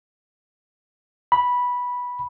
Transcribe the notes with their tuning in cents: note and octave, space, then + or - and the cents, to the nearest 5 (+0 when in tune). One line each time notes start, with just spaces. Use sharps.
B5 -10